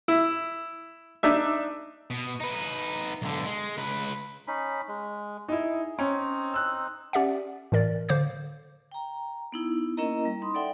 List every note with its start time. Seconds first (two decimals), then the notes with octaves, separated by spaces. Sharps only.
0.08 E4
1.23 D4 D#4 E5
2.11 B2
2.40 D#4 B4
3.22 B1 D3
3.47 G#3
3.77 C#2 B4
4.48 C#4 D#4 B5
4.88 G#3
5.48 D#4 E4 G#4
5.99 C4 C#4 D#4
6.54 E6 F#6
7.13 C#4 G4 D5 E5 F#5
7.72 A2 E3 A#4 D5 A6
8.09 D3 C5 F5 D6 G6
8.92 G5 A#5
9.52 B3 D#4 E4
9.97 A#3 C#4 E4 A#4 D#5 A#5
10.25 G3
10.42 D#4 B5 C6 D#6
10.54 A4 D5 E5 F#5 G5